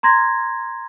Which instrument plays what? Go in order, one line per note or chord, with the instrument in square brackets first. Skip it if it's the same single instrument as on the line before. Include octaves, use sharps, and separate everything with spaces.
[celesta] A#5 C6 G#6 A#6